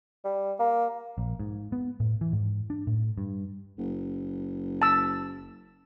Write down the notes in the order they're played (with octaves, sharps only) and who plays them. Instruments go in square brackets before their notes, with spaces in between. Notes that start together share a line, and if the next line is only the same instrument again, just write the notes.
[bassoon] G3
A#3
[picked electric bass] A#1
G#2
B3
A2
E3
G#2
D4
A2
G2
[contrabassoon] F#1
[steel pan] A5 E6